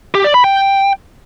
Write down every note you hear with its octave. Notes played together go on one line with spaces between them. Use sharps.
G4
D5
B5
G5